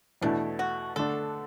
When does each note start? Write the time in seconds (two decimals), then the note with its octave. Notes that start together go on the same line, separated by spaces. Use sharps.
0.22 E2 B2 A3 D4 E4
0.59 F#4
0.96 D3 A3 D4 A4